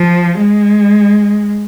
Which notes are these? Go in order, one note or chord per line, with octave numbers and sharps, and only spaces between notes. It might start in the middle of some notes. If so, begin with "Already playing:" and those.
Already playing: F3
G#3